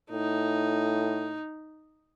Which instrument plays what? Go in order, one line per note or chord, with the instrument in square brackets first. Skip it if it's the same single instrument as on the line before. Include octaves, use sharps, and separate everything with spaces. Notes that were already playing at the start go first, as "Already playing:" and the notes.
[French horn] A2 [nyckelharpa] D#4